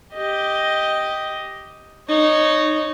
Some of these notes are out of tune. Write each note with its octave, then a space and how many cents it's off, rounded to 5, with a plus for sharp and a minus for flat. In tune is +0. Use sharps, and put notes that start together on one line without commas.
G4 +0 D#5 +5
D#4 -20 C#5 +0